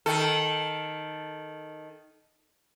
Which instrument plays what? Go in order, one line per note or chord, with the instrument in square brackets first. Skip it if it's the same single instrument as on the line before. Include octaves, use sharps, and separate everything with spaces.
[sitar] D#3 A4